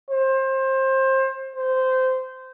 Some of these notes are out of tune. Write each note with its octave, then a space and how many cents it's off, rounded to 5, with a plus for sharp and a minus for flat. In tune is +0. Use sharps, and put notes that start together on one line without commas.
C5 +25
C5 -15